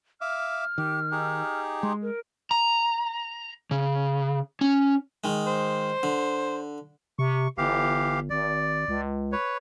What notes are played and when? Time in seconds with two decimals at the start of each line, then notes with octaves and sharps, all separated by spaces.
0.21 E5 F5 D6 F6
0.78 D#3 G4
1.12 D#4 G4 G#4
1.83 G#3 C6
2.02 A#4
2.51 A#5
3.71 C#3
4.61 C#4
5.24 D#3 G#3
5.47 C5
6.03 D3
7.19 C3 C#6
7.58 G1 E3 G4 F5
8.30 G#1 D5
8.88 C#2
9.32 B4 C#5